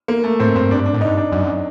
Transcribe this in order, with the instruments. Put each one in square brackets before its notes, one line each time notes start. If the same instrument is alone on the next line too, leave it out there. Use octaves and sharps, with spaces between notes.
[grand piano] A#3
A3
[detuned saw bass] A2 [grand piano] C4
[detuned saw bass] G2 [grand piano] C4
[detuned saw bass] G2 [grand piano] D4
[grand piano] D4
[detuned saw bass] A2
[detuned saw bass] G2 [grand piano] D#4
[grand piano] D4
[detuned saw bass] F#2